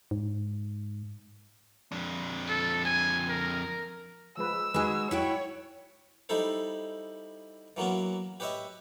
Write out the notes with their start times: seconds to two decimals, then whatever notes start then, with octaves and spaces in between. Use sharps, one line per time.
0.11 G#2
1.92 F2 D4
2.49 A4
2.85 G#5
3.29 A#4
4.37 F3 G#3 B4 E6
4.74 G#3 D#4 F#4 G#4 B4
5.11 E4 F#4 C#5 G5
6.29 G3 D#4 E4 A4 C5
7.77 E3 F#3 A#3 B3 C#4
8.40 G4 B4 C#5 D#5 E5